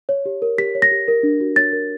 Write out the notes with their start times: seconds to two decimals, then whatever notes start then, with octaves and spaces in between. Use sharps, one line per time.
0.09 C#5
0.26 G4
0.42 A#4
0.58 G4 B6
0.75 C#5
0.82 A#6
0.92 G4
1.08 A#4
1.23 D4
1.41 F#4
1.56 C#5 A6
1.73 A#4